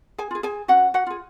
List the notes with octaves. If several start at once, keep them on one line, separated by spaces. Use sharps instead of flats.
G#4 G#5
F4 G#4
G#4 G#5
C#4 F#4 F#5
F#4 F#5
F4 G#4